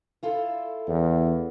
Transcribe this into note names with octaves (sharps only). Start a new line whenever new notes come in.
E4 F4 A4
E2